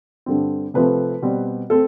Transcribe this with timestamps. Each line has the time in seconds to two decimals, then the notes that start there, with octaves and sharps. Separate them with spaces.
0.26 G2 D3 G3 C4
0.74 C3 F3 A3 C4 B4
1.22 B2 G3 C4
1.70 A3 C4 A4